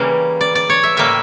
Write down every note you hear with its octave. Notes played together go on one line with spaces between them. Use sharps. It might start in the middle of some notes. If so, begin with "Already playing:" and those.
Already playing: C#3 E3 G3 A#3
D5
D5
C#5
E5
A2 G3 A#3 E5